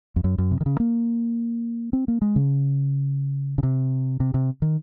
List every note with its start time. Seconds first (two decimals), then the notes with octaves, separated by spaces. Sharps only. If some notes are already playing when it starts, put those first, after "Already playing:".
0.16 F2
0.24 F#2
0.38 F#2
0.51 C3
0.61 D#3
0.66 C#3
0.80 A#3
1.93 C4
2.08 A#3
2.22 G#3
2.36 C#3
3.58 C#3
3.63 C3
4.20 C3
4.34 C3
4.62 D#3